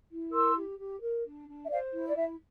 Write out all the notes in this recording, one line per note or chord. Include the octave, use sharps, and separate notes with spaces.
E4
A#4 C6 E6
G4
G4
A#4
D4
D4
E5
C5 D5 F5
E4
D5
E4 E5